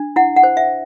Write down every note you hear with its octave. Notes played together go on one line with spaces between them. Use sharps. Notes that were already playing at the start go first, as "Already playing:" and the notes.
Already playing: D4
E4 F#5
F#5
C5
E5